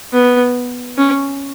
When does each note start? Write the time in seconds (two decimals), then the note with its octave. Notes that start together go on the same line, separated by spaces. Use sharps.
0.13 B3
0.98 C#4